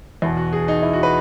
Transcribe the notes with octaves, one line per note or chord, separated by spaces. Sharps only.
E2 B2 E4
F#4
G#4
D#4
E4
F#4
B4